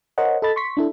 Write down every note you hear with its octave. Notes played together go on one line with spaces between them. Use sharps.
A#4 C5 C#5 D#5 F#5
A4 D#5 B5 A6
C6 C#6 B6
D4 E4 A4